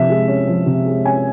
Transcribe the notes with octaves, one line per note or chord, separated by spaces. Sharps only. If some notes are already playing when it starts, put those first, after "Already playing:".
Already playing: C3 F3 E5
G#3
C#4
F3
C3
G#3
C#4 G#5